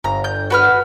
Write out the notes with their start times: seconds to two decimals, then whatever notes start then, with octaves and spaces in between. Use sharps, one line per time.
0.04 G1 A#5
0.24 G6
0.50 F#4 B4 F6